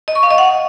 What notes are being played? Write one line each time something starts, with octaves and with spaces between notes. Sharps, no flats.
D#5
C#6
F5
D#5
F#5